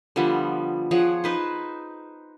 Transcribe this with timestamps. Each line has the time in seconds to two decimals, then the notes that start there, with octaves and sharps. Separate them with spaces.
0.16 D3 F3 G3 B3
0.91 F3 G#4 C#5 F#5
1.24 D#4 B4 C5